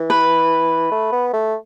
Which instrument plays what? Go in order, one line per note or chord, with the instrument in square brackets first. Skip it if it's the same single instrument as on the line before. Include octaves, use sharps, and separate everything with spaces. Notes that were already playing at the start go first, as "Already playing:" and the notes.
Already playing: [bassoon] E3
[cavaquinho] B4
[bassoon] A3
B3
A3